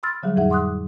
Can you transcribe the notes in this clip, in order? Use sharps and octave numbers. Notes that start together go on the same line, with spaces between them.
B5 C6 E6 F6 A6
D3 F#3 G3 G#4
F2 A2 G#4 E5 F#5
F#5 C6 D6 D#6 F#6